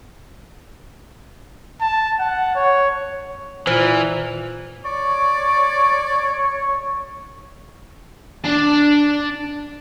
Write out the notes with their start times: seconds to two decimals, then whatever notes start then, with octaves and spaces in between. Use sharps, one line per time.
1.81 A5
2.19 F#5
2.55 C#5
3.67 A#2 E3 C5
4.85 C#5 D5 C#6
8.44 D4 A5